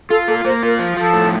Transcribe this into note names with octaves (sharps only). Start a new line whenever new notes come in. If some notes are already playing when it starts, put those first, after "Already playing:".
F4 A4
A#3 A4
A#3 C5
F4 A#4
F3
F3 A4
A2